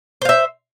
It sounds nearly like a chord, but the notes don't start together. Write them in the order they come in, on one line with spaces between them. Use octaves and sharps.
C5 F5 E5